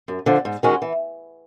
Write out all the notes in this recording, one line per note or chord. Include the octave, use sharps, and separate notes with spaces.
F#2
D3 F3
G#2
D#3 G#3 C#4 F#4
E3